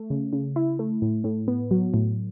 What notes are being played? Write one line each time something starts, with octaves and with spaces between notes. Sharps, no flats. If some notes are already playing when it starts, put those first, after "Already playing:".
Already playing: A3
C#3
C#3
E4
A3
A2
A2
B3
F#3
A2